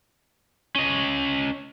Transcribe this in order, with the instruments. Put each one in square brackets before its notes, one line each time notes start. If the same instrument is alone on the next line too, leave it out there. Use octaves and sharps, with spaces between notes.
[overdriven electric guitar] C#4 D#5